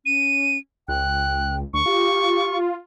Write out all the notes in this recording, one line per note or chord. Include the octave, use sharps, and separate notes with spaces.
C#4 D#7
C#2 G5 F#6
D2 C#6
F4 G4